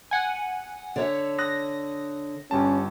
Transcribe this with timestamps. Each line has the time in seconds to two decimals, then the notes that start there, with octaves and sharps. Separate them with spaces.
0.11 F#5 G#5
0.96 D3 C#5 E5
1.39 D#6 F#6 A#6
2.51 G1 G3 C#4 A5